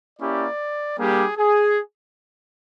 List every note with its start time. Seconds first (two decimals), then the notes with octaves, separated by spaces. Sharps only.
0.19 A#3 C#4 E4 G4 D5
0.98 G3 A#3 D4 G4 G#4
1.37 G#4